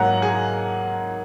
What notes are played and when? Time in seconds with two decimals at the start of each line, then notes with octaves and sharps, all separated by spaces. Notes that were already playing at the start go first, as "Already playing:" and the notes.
Already playing: G#2 F#3 A#3 F#5 A#5
0.22 G#4